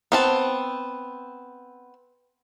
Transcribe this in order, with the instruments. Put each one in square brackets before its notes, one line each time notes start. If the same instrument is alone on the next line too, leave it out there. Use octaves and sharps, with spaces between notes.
[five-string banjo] B3 C4 A5